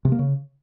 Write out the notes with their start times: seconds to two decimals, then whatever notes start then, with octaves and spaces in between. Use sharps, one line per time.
0.05 C3
0.12 A#3
0.19 C#3